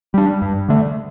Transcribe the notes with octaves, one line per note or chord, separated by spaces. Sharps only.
G3 D4
G2
D3 A3